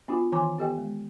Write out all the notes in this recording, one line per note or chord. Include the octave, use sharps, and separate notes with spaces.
B3 D4 F4 F#4
D#3 E3 G#5 A#5 C6 D6
B3 G4 A4 D#5 G5
G#3